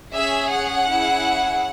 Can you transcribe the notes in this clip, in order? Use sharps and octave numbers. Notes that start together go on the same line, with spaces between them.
C#4 G#4 E5
F#5
C#4 E4 G#4